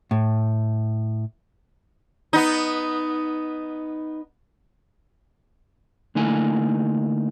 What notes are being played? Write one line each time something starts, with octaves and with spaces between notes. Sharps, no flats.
A2
B3 D#4
D3 A3 A#3 D#4 E4 G#5